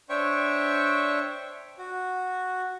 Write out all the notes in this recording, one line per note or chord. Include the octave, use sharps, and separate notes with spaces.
D4 C5 C#5 E5 G5 C#6
F#4